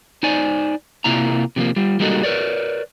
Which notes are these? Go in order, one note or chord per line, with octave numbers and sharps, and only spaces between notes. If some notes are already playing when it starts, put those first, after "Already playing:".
D#4 C5 D5 G#5
C3 A#3 E4 F4 A#5
C3 F3 G#3 A#3
G3 F4
G3 G#3 A#3 D#4 F#4 A4
A#4 B4 C#5 D5